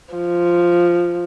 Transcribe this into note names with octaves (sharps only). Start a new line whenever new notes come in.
F3